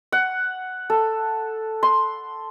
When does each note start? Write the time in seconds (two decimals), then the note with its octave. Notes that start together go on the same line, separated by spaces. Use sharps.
0.12 F#5
0.90 A4
1.83 C6